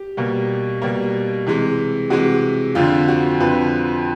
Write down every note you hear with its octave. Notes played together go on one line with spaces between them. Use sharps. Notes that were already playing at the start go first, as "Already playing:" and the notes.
Already playing: G4
B2 G3 A#3
B2 G3 A#3
C3 E3 G#3
C3 E3 G#3 F#4
F2 D3 F3 F4
F#4
F2 D3 F3 B4